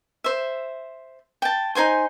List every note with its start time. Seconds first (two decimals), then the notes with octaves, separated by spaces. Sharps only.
0.24 C5 E5
1.42 G5 A5
1.75 D#4 C5 G#5 C6